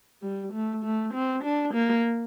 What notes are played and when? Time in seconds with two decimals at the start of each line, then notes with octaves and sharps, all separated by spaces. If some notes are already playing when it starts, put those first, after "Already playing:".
0.22 G3
0.52 A3
0.83 A3
1.13 C4
1.43 D4
1.74 A#3